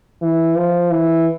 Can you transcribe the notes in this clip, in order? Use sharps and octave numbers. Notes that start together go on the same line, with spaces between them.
E3
F3
E3